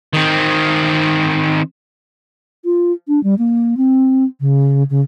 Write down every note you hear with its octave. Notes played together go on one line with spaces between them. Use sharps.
D#3 C4
F4
D4
G3
A#3
C4
C#3
C#3